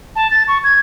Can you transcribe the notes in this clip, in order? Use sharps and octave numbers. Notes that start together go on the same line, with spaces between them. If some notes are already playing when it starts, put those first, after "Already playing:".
A5
A6
C#6
G#6